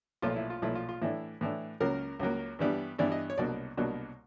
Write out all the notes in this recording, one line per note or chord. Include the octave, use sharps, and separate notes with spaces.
B1 A#2 F3 A3 F4
E4
F4
B1 A#2 F3 A3 E4
F4
F4
A2 E3 A3 D4 E4
A2 E3 A3 D4
C#2 C#3 F#3 A#3 A#4
C#2 C#3 F#3 A#3
G2 E3 G3 B3 D4
G2 E3 G3 B3 D4 D5
D#5
C#5
C2 B2 F#3 A#3 D4 D5
C2 B2 F#3 A#3 D4